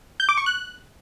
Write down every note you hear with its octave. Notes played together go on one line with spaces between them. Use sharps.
G6
D6
C#6
F#6